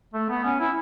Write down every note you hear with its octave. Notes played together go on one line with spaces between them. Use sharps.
A3
B3
C#4
E4